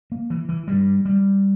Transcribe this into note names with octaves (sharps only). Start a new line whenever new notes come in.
A#3
E3
E3
G2 G3
G3